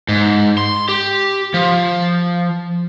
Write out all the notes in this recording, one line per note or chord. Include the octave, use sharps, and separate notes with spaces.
G#2
C6
G4
F3